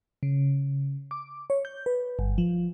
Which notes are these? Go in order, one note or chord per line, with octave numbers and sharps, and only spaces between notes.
C#3
D6
C#5
G6
B4
G1
F3